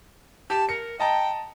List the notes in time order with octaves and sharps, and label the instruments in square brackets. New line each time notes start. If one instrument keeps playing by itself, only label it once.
[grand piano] G4 [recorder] A5
[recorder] A#4 [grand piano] C#7
[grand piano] D#5 A5 A#5 [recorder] G5